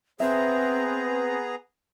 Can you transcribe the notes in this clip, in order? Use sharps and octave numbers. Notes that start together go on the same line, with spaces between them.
B3 C4 G#4 B4 E5 A#5